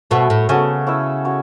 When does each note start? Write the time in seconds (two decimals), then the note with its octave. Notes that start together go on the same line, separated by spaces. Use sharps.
0.11 B2 A3 F#4 B4
0.30 A2
0.49 C#3 B3 F#4 A4 C#5
0.87 C#4 E4 B4 E5
1.25 C#4 F#4 C#5